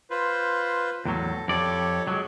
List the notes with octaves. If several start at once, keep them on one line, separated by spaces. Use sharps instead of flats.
F4 B4 C5
E2 A2 F#3 A4
F2 G4 A4 C#5 D5
F#3 G#3